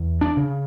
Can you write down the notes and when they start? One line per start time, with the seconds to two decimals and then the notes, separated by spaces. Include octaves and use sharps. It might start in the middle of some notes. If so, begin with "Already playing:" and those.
Already playing: E2
0.21 D4
0.37 C#3